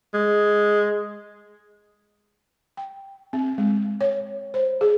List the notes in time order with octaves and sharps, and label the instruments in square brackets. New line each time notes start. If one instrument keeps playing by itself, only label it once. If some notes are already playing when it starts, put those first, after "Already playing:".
[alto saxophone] G#3
[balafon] G5
C4
G#3
C#5
C5
G#4